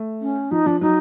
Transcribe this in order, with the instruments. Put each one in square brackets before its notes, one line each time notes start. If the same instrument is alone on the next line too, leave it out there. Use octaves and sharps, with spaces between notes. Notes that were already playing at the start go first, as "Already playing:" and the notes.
Already playing: [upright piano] A3
[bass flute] C#4
[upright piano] F3 [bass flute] D#4
[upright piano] F3 [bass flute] D4
[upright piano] F#3 [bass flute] D#4